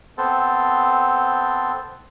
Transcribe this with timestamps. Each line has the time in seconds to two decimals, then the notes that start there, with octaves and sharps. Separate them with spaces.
0.18 B3 C4 A4 C5